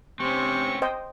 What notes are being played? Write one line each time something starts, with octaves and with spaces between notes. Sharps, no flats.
C3 C4 C#4 C#6
C5 D#5 G5